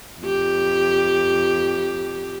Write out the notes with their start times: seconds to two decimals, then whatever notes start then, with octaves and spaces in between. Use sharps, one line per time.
0.21 F2 G4